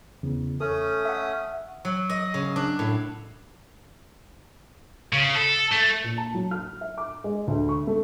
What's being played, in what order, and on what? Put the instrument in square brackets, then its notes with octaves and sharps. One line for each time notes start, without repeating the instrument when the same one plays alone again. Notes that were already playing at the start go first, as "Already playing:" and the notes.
[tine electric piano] E2 C#3
[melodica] A3 C#4 D#6 [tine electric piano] A4
[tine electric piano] E5 F#5
[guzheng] F#3
D#5
C#3
D4
A2
[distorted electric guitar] C#3
A4
A3
[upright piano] A#2
A5
F#3
F6
E5
D6
G#3
D2
C#6
A3